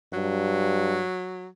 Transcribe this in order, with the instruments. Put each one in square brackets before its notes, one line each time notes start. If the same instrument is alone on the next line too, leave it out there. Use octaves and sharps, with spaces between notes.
[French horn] G2 [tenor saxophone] F#3